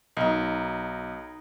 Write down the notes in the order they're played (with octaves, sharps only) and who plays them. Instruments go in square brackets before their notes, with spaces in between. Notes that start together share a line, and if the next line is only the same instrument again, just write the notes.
[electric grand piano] B1 [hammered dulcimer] D#4 D#5